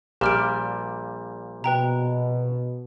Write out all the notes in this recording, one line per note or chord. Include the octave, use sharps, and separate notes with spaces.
A#1 A#2 G3 G4 F6 D7
B2 B4 G5 A#5